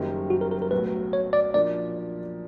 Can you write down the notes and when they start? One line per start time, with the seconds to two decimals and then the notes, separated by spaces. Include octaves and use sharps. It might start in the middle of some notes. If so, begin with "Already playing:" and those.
Already playing: F#1 F#2 D#3 G3
0.30 F#4
0.41 A#4
0.51 A#4
0.62 A#4
0.71 B1 A2 F#3 B4
1.13 C#5
1.33 D5
1.53 A#2 F3 A#3 D4 D5